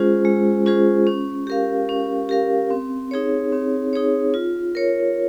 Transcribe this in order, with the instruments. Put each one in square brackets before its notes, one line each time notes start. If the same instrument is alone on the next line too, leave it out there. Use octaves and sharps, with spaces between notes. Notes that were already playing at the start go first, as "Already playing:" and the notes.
Already playing: [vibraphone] G#3 C#4 F4 G#4 C5
G#3
C#4 F4 G#4 C5
C#4
G4 A#4 F5
C#4
G4 A#4 F5
C4
D#4 G#4 C#5
C4
D#4 G#4 C#5
F4
A#4 C#5